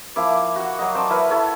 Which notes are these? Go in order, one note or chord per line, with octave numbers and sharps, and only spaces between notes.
F3 A#3 E4 D6
F#4 F#5
F#3 A#3 D#5
C5 D5 A5 C6
E4 A#4 B4 C#5
E4 A4 C#5